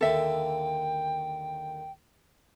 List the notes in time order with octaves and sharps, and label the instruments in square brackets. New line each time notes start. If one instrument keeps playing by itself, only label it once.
[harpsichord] D#2 D3 A#3 [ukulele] A4 E5 [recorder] G5